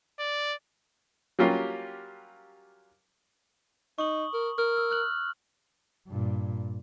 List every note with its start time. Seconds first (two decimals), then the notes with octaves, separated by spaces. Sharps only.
0.20 D5
1.39 F#3 G3 A#3 C#4 F4 G4
3.98 D#4 C#6 D#6 F#7
4.34 A#4
4.58 A#4 F6
4.77 E6
4.91 F6 F#6 F#7
6.08 G2 A#2